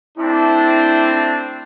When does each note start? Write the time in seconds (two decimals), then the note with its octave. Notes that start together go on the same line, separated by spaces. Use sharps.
0.18 A3 C4 D4 E4